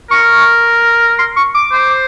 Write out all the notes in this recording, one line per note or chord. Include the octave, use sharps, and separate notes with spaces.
A#4 C#6
C6
C#6
D6
C5